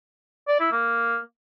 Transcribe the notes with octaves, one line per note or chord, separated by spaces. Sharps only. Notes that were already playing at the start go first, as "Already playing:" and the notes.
D5
E4
A#3